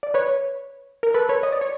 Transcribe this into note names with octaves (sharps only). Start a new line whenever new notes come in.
D5
B4 C#5
A#4
A4 B4
B4 C#5
D#5
D5
C#5